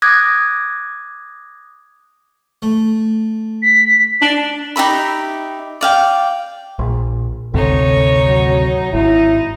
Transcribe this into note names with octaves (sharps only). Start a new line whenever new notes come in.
D6 D#6 F#6 G#6 A#6
A3
B6
D4
D#4 G4 E5 B5
D5 F5 G5
A#1
G#1 D2 C3 D#4 A4 C#5
F#3
G#1 D#4 E4